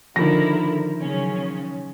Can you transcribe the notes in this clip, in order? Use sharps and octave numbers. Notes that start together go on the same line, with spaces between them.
D3 D#3 F3 E4 A#4 A#6
C#3 F#3 C#4